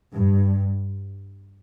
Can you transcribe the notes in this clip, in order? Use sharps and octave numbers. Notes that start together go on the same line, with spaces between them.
G2